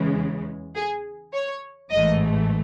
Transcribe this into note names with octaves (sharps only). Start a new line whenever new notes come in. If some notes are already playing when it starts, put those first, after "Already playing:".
Already playing: E2 C#3 E3 G#3
G#4
C#5
A1 G#2 E3 A3 D#5